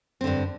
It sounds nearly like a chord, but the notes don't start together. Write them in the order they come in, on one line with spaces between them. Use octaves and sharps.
C4 D3 G2